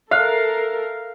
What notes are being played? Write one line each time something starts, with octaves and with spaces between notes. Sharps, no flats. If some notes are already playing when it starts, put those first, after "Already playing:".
A4 A#4 E5 F5 F#6